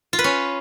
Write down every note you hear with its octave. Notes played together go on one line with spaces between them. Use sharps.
F4
B4
C#4